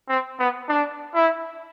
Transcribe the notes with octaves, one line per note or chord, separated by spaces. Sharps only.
C4
B3
D4
E4